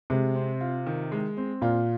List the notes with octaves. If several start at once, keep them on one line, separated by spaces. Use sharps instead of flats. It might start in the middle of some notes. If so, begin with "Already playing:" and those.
C3 G#3
C4
F4
D#3
G#3
C4
A#2 F4